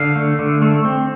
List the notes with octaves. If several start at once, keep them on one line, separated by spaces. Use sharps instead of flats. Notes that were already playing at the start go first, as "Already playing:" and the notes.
Already playing: D3 F5
A3
D3
A3
C4